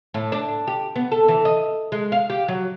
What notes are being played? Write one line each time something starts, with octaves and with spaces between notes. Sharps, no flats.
A2
D4
G4
B3
A4
E3
D#5
G#3
F5
G4
F#3